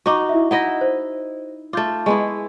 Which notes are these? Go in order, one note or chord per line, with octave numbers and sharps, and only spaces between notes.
D#4 F#4 C#6 D6
E4 E5
D#4 E4 D#5 F#5 A#6
C5
A3 F4 D6 G6 A6
G#3 B3 E4 C#6